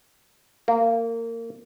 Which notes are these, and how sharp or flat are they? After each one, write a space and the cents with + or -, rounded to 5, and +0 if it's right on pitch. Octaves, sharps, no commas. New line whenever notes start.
A#3 -25